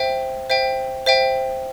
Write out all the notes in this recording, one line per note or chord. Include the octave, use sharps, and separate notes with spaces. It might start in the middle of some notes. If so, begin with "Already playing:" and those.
Already playing: C5 E5 G5
C5 E5 G5
C5 E5 G5